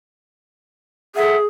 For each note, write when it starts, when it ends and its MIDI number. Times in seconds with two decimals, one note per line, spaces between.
1.16 1.46 68
1.16 1.36 69
1.16 1.36 76
1.16 1.36 78